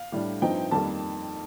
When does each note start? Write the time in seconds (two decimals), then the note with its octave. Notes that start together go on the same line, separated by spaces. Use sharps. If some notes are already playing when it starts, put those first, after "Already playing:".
Already playing: F5
0.12 A2 G3 D4
0.42 G2 F3 C4 D#4 G5
0.71 F2 D#3 G3 A#3 A5